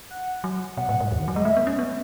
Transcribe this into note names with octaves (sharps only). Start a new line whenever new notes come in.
F#5
F#3
B2 F#5
A2
G#2
E2
D#3
F#3
G#3 D#5
A3 E5
B3
C#4
B3